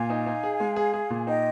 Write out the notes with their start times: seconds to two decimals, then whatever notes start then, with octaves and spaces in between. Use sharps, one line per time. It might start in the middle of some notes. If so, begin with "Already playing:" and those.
Already playing: A#2 F5 G#5
0.10 D#4
0.26 D#4
0.43 G#4
0.60 G#3
0.76 G#4
0.94 G#4
1.10 A#2
1.27 D#4 D#5 G5